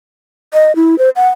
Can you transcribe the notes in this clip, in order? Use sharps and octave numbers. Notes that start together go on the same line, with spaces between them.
D#5
E4
C5
F#5